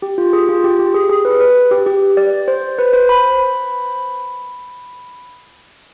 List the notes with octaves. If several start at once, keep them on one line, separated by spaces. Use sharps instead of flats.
G4
F4
G#4
F4
G4
G4
G#4
G#4
B4
B4
G4
G4
D5
C5
B4
C5
B5